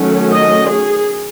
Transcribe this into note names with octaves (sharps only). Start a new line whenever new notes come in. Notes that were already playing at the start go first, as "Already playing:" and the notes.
Already playing: D#3 F#3 A3 C#4
D#5
G#4